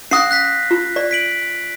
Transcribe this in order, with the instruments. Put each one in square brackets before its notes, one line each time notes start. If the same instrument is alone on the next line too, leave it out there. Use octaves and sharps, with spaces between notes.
[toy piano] C#4 F5 D#6 [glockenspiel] F#6 A#6 C7
[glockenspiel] F#6 A#6 B6
[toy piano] F4
D5
[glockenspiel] B6 D7 F#7